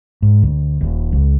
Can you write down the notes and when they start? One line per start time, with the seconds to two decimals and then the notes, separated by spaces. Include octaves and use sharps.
0.22 G#2
0.43 D2
0.81 D#1
1.13 C#2